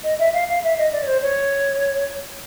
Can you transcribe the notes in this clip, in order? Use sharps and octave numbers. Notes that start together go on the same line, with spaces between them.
D#5
E5
F5
F5
E5
D#5
D5
C#5
C5
C#5